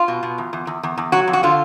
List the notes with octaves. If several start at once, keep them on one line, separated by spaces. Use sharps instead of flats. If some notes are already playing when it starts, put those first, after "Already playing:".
Already playing: F4
B2
B2
E2
E2
E2
E2
E2
F#3 F#4
F2
F#4
D3 F4